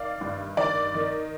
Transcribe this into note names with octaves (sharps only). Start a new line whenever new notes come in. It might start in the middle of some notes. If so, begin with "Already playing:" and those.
Already playing: D#3 D5 F5
G2
D#3 D5
D#3